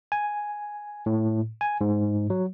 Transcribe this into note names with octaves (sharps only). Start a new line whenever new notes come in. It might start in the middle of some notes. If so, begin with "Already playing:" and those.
G#5
A2
G#5
G#2
F#3